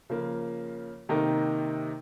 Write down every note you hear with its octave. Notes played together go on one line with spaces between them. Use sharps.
C#3 F3 A#3
C3 D#3 A#3 D#4 A#4